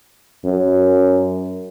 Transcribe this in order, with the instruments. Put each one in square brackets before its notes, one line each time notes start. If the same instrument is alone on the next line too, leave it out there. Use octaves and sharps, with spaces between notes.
[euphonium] F#2